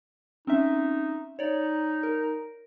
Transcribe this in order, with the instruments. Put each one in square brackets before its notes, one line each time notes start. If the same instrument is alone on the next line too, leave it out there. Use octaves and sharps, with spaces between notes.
[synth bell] C4 C#4 E5 [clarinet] D#4
[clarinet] D#4 [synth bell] C#5 D5
[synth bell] A#4